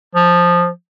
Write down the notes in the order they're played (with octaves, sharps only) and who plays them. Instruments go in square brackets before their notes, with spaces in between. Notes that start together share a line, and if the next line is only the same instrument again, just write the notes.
[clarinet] F3